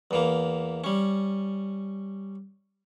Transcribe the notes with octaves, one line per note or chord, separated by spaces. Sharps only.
E2 E3 A#3
G3 C#4